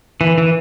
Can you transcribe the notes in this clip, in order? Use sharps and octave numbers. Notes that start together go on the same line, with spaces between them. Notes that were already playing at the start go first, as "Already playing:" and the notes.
E3
E3